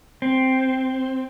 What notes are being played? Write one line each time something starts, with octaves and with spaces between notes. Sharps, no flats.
C4